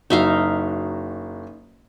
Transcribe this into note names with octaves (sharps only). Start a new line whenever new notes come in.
F#1 D#4 F#4 E5 F5